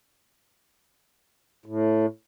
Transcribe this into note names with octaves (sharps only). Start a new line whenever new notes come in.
A2